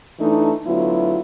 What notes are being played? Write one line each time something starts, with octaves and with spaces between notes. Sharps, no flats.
E3 A3 D4 D#4
D2 F#3 B3 E4 F4